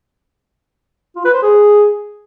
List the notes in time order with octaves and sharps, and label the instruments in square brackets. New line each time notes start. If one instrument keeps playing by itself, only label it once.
[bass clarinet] F4
B4
C5
G#4